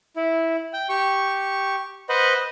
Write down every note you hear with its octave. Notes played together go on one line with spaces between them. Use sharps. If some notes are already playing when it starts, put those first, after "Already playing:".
E4
G5
G4 C#6
B4 C5 D#5 F#5